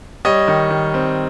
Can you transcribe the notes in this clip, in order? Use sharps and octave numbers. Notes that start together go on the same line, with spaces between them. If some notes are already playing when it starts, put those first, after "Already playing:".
G3 C#5 D#5
D#3
D#3
C4